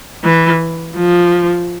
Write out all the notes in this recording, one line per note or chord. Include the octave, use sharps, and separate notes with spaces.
E3
F3